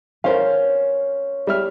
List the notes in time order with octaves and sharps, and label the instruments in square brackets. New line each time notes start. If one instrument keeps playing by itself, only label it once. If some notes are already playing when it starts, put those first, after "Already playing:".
[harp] C#4 [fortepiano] A#4 C5 F5
[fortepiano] G3 E5 F6